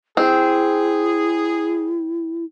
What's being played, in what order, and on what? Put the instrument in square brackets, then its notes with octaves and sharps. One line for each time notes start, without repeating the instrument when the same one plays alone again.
[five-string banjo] C4 [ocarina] E4 [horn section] G#4